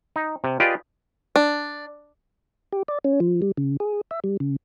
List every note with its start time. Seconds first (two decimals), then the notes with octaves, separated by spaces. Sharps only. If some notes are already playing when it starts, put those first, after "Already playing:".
0.16 D#4
0.44 C3
0.60 F4 G4 G#4 B4 D5 D#5
1.36 D4
2.72 G4
2.88 D5
3.04 C#4
3.20 F3
3.42 G3
3.57 C#3
3.80 G#4
4.11 E5
4.24 G3
4.40 C#3